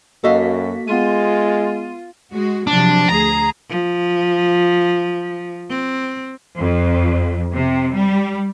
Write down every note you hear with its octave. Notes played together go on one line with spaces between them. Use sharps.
F#2 A#3 F#4 A4 D#5 F5 B6
G#3 B3 F4 C6 D#7
G#3 F#4
C3 F3 F#3 D4
D2 G#4 A#5
F3
C4
F2
C3
G3